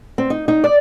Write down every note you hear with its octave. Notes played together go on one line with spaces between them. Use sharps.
C4
D#4
D#4
D5